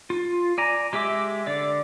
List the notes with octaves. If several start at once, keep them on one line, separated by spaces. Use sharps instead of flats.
F4
D5 G#5 A#5
G#3 G4 G#4 E5 D6
D3 D5